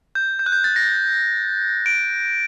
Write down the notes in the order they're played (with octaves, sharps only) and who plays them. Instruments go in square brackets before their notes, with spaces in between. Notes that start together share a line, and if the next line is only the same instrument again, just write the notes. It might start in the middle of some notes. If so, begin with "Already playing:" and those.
[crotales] G6
G6
F#6
G6
A6
A#6
D7